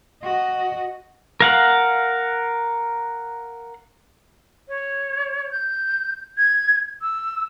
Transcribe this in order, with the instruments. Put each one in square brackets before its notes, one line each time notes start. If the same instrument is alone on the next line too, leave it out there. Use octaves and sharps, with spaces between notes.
[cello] F#4 D#5
[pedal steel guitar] A#4 F5 F#5
[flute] C#5
G6
G#6
E6